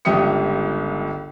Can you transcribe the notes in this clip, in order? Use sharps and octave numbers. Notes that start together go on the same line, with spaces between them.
G1 C#2 G4 E5 D#6 C#7